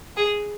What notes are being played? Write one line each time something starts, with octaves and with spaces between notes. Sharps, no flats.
G#4